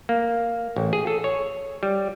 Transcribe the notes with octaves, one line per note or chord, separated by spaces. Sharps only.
A#3
A1
G#4
A4
C#5
G3